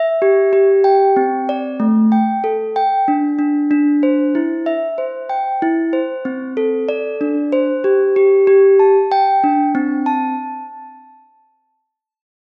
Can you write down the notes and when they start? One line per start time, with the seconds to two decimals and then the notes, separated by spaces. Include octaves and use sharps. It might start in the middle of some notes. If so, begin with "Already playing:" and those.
Already playing: E5
0.22 G4
0.53 G4
0.84 G5
1.16 C4
1.49 D5
1.80 A3
2.12 G5
2.44 A4
2.76 G5
3.08 D4
3.39 D4
3.71 D4
4.03 C5
4.35 E4
4.66 E5
4.98 C5
5.29 G5
5.62 E4
5.93 C5
6.25 C4
6.57 A4
6.89 D5
7.21 D4
7.52 C5
7.84 G4
8.16 G4
8.47 G4
8.79 A5
9.12 G5
9.43 D4
9.75 C4
10.06 A5